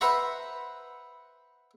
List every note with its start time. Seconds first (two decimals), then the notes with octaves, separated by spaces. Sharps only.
0.01 B4 C5 E5 F#5 A#5 B5